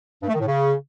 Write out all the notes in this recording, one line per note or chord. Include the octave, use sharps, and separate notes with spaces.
G2
A3
D#3
A2
C#3